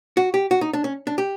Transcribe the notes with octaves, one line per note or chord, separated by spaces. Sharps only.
F#4
G4
F#4
D#4
D4
C#4
D4
G4